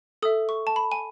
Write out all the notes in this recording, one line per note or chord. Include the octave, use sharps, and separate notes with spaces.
A4 E5 D#6
C#6
A5
B5
G#5